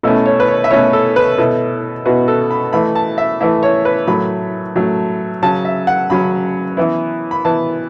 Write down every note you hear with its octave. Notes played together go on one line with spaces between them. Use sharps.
B2 A3 C#4 E4 A4
C#5
B4
C#5
E5
B2 A3 C#4 E4 C#5
A4
B4
B2 B3 E4 A4
B2 B3 E4 F#4
A4
B5
E3 A3 E4 B5
A5
E5
E3 A3 E4 E5
C#5
B4
A2 F#3 A3 B5
A2 F#3 A3
C#3 F#3 C#4 A5
E5
F#5
C#3 F#3 C#4 B5
E3 B3 E4
B5
E3 B3 E4 A5